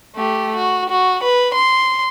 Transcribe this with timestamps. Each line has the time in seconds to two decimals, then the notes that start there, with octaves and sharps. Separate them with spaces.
0.16 A3 G4
0.56 F#4
0.90 F#4
1.23 B4
1.54 C6